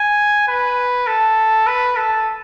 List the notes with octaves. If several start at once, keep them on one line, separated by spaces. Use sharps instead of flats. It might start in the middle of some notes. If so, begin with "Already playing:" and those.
Already playing: G#5
B4
A4
B4
A4